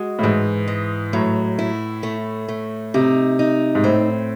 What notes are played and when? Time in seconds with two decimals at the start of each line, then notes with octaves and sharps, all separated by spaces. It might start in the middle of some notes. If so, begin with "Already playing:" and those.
Already playing: G#3 F#4
0.19 A2
0.23 G#2 E3
0.68 G#3
1.13 A2 F#3
1.59 E4
2.03 A3
2.48 A3
2.94 C3 D#4
3.39 D#4
3.75 G#2
3.84 A2 C4